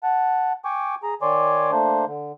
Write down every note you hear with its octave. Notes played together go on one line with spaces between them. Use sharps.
F#5 A5
G5 G#5 C#6 D6
G#4 A#5
D#3 C#5 D5 G#5 C6 D6
A3 A#3 D4 C5
D3